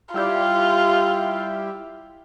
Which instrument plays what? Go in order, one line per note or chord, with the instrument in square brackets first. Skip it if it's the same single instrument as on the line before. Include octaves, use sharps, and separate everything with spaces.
[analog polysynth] G3 E4 G4 [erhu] F4